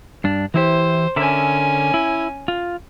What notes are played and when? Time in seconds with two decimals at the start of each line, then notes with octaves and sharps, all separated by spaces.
0.24 G2 D4
0.54 E3 E4 G4 C5
1.16 D3 C#4 A#4 E5 G#5
1.94 E4
2.48 F4